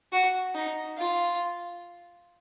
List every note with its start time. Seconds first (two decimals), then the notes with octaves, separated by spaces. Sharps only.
0.12 F#4
0.55 D#4
0.98 F4